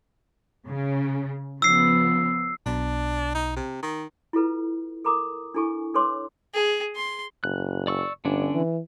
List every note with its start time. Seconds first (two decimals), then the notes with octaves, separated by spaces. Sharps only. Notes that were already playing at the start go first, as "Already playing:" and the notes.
0.67 C#3
1.62 C#3 F3 B3 E6 C7
2.66 B1 B2 D4
3.35 D#4
3.56 C3
3.82 D#3
4.33 E4 F4 A4 B4
5.05 A4 A#4 A#5 D6 D#6
5.54 D4 E4 A4 G#5 C#6
5.94 D4 A4 B4 C#5 C6 D6
6.54 G#4
6.96 C6
7.44 F#1 F#6
7.87 D5 C#6 E6
8.25 G1 D3 C#4 D4
8.55 E3